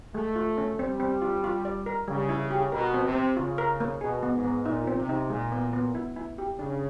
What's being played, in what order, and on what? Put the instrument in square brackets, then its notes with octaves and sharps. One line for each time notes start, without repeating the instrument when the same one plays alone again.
[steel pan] G#3 [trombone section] A3
[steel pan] F4
C#4
[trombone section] G3 [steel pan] C4
[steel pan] C4
F4
F4
D5
A#4
[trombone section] C#3 [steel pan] G3
[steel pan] E4
G4
[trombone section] B2 [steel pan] A#4
[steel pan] C4
[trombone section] C3
[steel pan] C4
[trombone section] C#3 [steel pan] F4
[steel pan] A#4
A#3
[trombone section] B2 [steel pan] G#4
[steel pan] B3
[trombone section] G#2
[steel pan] B3
[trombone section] A#2 [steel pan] D#4
[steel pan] C4
[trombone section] C3
[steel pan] D#4
[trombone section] A#2 [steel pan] G#3
[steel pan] B3
B3
E4
E4
G4
[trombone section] C#3 [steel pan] D4